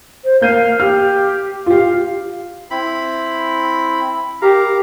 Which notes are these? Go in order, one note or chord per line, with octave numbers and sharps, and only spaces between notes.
C5
A#3 F5 G6 D#7
G4 F6
F4 G4 F5
C4 E4 B5
G4 A#4 F5 A#5